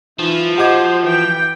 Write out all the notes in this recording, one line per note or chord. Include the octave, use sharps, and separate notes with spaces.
E3 F3 D#4
F#4 G4 C5 D#5 D6 G#6
E3 G5